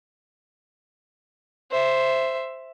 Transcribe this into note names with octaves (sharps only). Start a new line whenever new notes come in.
C5 E5